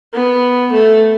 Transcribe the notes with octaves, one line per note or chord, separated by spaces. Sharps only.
B3
A3